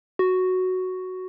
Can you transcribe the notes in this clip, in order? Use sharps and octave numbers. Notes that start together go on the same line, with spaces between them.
F#4